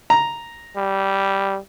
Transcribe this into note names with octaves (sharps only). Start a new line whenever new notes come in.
A#5
G3